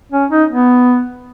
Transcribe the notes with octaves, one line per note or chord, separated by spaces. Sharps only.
C#4
D#4
B3